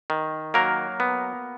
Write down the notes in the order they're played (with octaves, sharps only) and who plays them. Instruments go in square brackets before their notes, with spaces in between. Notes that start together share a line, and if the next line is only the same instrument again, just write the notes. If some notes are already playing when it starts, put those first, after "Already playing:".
[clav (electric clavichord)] D#3
F#3 A#3 A#4
B3